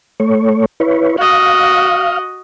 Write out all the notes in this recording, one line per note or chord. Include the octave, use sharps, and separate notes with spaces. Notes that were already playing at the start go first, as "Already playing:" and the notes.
A3 C#5
E4 B4 C#5
F#4 D#5 F5